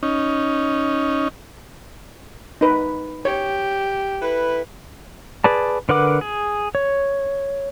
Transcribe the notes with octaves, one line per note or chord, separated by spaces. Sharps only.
C#4 D#4
D#4 B4
G4 C#5
E4 A4 B4
G#4 B4 D5 A5
D3 A#4 B4 F#5 D6
G#4
C#5